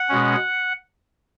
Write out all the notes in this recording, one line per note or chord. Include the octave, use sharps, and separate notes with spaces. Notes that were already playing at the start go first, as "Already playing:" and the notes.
Already playing: F#5
B2 G#3 C#4